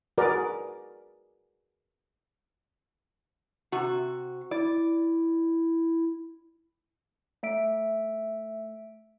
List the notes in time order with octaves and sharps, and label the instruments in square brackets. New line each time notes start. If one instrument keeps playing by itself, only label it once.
[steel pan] F#4 G#4 A#4 B4 D5
[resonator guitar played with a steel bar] C3 F#4
[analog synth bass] E4 [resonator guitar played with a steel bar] D5
[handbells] A3 E5 D7